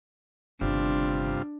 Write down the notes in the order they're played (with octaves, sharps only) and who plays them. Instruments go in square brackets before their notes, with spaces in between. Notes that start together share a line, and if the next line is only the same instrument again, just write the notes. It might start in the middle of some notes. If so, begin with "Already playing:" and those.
[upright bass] G1 D#3 [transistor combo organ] G2 C3 F4 [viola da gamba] D4